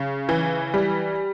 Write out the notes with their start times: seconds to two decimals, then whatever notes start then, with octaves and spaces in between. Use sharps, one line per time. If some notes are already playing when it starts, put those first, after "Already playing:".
Already playing: C#3
0.29 E3
0.74 G3